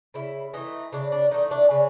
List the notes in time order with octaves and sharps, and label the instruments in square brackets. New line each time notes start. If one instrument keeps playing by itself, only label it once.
[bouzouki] C#3 E4
E3 A3 D#4
C#3 D4
D4
E3 A3 D#4
D4
C#3 C#4